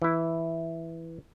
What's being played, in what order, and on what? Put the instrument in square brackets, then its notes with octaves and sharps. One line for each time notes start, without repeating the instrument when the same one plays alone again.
[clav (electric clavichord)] E3 E4